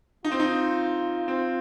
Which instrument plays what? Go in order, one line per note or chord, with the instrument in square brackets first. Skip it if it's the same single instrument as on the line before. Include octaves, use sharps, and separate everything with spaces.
[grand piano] D#4 [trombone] F4
[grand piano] C4
D#4
[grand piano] C4 [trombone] F4